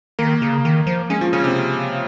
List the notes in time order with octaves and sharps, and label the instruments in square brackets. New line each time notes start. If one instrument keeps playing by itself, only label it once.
[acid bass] D#3 [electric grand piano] A#3
[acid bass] C#3
D#3
F3
[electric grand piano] G#3 [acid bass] C#4
[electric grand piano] F3
[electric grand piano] C#3 [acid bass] C#4
[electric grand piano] C3